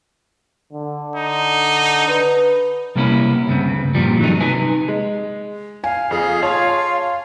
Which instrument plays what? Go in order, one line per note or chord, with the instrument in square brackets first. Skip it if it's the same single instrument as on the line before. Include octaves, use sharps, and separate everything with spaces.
[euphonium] D3
[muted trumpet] D#4
[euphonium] B4
[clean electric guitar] C3 G3 A#3 B3 C#4 E4
D2 G2 C#3 B3 C4
G2 A#2 F3 G3
D#3 F#3 G3 A3 D#4
C3 D#4 B4 G#5
[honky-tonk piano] G#3
[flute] F5 [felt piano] G#5
[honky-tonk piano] F2 [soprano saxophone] G#4
[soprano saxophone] F4 [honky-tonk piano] C#5 A5